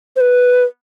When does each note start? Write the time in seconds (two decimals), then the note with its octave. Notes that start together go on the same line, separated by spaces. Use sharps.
0.16 C5
0.21 B4